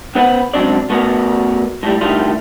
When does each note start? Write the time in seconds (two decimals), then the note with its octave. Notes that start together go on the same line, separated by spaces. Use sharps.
0.15 B3 B4 C5 F#5 G#5 B5
0.54 C#2 G2 F#3 C4 D4 D5
0.90 A3 B3 F#4 A#4 D5
1.83 A2 G3
2.01 D2 A2 D#3 G3 A3 F4